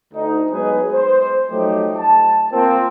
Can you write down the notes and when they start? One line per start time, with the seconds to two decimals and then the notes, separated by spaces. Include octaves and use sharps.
0.13 D2 D#4
0.51 F#3 G#3 B3 D#4 G#4 B4
0.93 C5
1.51 F3 F#3 A3 D#4 G4
1.97 A5
2.52 F3 A#3 C4